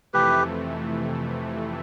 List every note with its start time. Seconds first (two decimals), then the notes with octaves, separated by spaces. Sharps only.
0.13 F2 C3 E3 A3 G4 B4